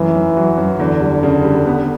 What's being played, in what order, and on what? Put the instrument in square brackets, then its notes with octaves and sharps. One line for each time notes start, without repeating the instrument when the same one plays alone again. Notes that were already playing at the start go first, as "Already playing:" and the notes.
Already playing: [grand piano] F#2 A3 [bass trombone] E3
[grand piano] F#2
F#3
F#2
[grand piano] E2 [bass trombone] D3
[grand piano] G3
C#3
G3
B3